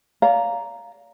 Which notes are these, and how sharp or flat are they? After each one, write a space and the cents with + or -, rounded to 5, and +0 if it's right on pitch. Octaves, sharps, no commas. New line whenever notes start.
D5 -40 F5 +0 A#5 +0